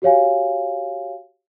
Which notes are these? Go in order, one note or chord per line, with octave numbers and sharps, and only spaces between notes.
F#4 G4 C#5 F5 G#5